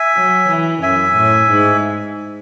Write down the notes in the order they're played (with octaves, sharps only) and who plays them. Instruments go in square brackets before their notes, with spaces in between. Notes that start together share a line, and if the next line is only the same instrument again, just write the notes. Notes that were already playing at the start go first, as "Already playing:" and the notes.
Already playing: [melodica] E5 G#5
[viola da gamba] F#3
E3
[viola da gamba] F#2 [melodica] E5 G#5
[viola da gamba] A2
G#2